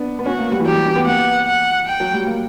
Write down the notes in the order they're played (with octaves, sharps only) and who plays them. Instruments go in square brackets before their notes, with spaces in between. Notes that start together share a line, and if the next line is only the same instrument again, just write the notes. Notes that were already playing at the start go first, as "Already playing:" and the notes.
Already playing: [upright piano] B3 D4
B3
[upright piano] C#4 [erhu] F#4
[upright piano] A#3
G3
E3
[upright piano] F#3 [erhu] G4
[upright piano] G3
C#4
B3
[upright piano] A#3 [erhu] F#5
[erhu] F#5
G5
[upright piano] F#3
G3
A#3